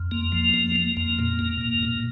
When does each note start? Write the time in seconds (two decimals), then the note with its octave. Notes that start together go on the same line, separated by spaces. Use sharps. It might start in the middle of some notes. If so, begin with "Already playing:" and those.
Already playing: F2
0.11 A#3
0.32 F3
0.54 A#3
0.76 A#3
0.97 F2
1.19 A#2
1.39 A#3
1.61 A#2
1.83 A#2